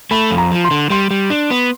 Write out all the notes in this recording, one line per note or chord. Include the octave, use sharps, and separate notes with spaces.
A3 B5
F2
A#5
F3
C6
D3
G3 C6
G3
D4
B3